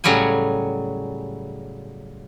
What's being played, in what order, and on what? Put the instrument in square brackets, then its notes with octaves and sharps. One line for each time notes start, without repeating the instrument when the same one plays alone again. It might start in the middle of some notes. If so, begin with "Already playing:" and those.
[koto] A2 C#3 F#3 G3 C#5 G#5